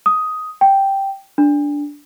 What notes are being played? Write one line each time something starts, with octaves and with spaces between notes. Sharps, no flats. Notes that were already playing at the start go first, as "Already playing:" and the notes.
D#6
G5
D4